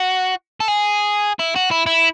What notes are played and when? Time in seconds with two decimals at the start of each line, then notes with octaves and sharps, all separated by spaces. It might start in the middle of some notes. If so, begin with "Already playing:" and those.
Already playing: F#4
0.60 A4
0.68 G#4
1.39 E4
1.56 F#4
1.71 E4
1.86 E4